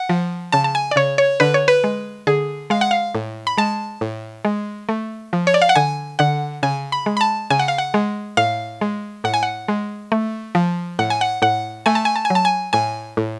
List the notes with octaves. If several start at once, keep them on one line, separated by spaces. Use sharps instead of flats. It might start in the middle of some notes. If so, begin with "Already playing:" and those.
Already playing: F#5
F3
C#3 A5
A5
G#5
D5
C#3 C#5
C#5
D3 B4
C#5
B4
G#3
D3 G#4
G#3 F5
F#5
F5
A2
B5
G#3 A5
A2
G#3
A3
F3
C#5
D5
F5
F#5
D3 G#5
D3 F#5
C#3 G#5
B5
G#3
B5
A5
C#3 G#5
F#5
F5
F#5
G#3
A2 F5
G#3
A2 F#5
G#5
F#5
G#3
A3
F3
A2 F#5
G#5
F#5
A2 F#5
A3 G#5
A5
G#5
A5
G#5
F#3 A5
G#5
A2 G#5
A2